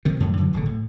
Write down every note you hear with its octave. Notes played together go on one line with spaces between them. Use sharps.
C3 D#3
F#2 A2 D#3 F#3
F#2 D3 E3 F#3
D1 G#1 A#2 D3
A2